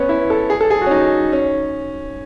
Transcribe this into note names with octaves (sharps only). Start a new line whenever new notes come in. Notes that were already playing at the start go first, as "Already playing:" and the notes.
Already playing: B3 C#4
E4
A4
G#4
A4
G#4
F#4
C#4
D#4
C#4